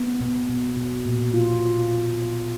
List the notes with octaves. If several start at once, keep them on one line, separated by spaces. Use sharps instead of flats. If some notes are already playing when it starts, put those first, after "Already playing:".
Already playing: B3
B2
B2
B2
A#2
F4